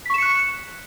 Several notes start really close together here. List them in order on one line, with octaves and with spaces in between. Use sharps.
B6 C#6 E7 C#7 F#6